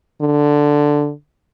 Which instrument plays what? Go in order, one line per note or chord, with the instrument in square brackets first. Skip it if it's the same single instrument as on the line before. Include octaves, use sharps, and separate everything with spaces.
[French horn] D3